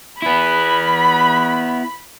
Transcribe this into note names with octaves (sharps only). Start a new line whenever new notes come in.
B3 E4 B5